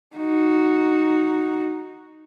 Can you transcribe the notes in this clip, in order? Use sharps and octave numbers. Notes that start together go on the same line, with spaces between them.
D#4 F#4